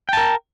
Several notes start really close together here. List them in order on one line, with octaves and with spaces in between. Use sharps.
G5 A5 A#4